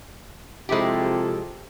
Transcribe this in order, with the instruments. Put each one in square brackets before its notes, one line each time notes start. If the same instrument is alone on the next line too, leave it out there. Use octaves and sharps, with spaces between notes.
[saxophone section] C3 F3 A4 [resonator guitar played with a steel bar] G#3 E4 G4